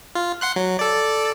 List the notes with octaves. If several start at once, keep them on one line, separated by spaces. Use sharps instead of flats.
F4
F#5 C6 F#6
F#3
A4 D5